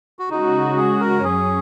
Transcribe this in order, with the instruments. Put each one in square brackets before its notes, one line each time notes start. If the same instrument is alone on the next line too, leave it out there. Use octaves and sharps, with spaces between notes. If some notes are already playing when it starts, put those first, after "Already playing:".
[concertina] F#4
[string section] C#3 G#3 F#4 [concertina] D#4
[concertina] G#4
A#4
[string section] F#2 F#3 C#4 [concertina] G#4